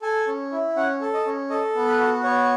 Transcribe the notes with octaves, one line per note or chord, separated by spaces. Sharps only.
A4 G#5
C#4
E4
C#4 F#5
A4
D#5
C#4
A4 D#5
B3
B4
F#4
B3 C#5